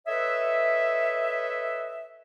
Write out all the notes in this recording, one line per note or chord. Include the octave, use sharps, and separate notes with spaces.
A4 B4 C#5 D#5 E5